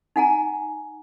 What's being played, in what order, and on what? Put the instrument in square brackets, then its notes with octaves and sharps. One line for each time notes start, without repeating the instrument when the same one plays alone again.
[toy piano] D#4 F#5 G#5 A#5